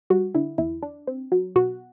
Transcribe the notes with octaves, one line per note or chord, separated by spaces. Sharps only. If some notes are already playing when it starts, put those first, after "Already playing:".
G3 F#4
D3 E4
E2 E4
D4
C4
F#3
B2 F#4